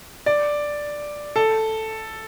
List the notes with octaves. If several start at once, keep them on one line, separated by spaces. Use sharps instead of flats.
D5
A4